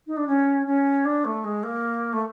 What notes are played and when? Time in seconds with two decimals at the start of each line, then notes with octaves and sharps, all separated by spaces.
0.07 D#4
0.17 D4
0.27 C#4
0.66 C#4
1.05 D4
1.25 A3
1.44 G#3
1.63 A#3
2.13 A3